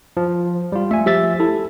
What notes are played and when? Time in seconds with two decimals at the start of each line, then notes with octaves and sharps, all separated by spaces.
0.17 F3
0.72 G3 F4
0.91 A3 E5 G#5
1.06 F3 G4 E5 A6
1.40 E4 A4